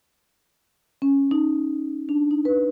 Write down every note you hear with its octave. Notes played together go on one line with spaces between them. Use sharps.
C#4
D#4
D4
D#4
B4